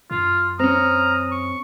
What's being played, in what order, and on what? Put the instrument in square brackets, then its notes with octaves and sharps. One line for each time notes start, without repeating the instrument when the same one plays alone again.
[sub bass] F#2 [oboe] F4
[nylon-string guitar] C4 C#4 [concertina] A#5 F6 [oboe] D#6
[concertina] C#6